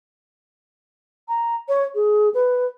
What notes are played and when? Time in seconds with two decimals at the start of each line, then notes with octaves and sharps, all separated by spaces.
1.28 A#5
1.69 C#5
1.95 G#4
2.34 B4